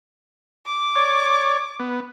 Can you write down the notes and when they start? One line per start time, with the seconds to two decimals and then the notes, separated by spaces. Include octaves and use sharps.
0.66 D6
0.96 C#5 D5
1.80 B3